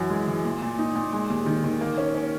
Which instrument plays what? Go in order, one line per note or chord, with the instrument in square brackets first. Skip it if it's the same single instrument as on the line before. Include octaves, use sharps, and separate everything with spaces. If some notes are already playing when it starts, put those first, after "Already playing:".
Already playing: [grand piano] F#2 E3
G#3
E3
A#2
A#2
D#4
A#2
G#3
D#2
D#3
D#3
A#3
C#4
C#4